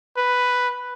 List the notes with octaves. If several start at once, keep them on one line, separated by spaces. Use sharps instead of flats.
B4